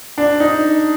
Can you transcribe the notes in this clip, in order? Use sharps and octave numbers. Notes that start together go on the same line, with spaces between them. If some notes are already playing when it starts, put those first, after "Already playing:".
D4
D#4